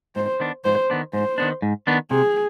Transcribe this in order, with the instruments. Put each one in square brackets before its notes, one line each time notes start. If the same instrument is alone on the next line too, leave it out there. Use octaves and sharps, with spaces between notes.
[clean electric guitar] G#2 [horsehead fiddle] C5
[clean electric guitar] D#3 B3 D4
[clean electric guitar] G#2 [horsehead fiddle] C5
[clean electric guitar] D#3 B3 D4
[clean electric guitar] G#2 [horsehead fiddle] C5
[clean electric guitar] D#3 B3 D4
G#2
D#3 B3 D4
[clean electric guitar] C3 [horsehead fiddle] G#4